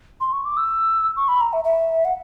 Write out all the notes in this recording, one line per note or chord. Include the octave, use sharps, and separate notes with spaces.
C6
C#6
D6
E6
C#6
B5
A#5
E5
E5
F#5